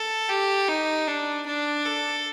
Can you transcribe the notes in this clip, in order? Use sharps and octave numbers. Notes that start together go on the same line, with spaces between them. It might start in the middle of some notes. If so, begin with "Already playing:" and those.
Already playing: A4
G4
D#4
D4
D4
A4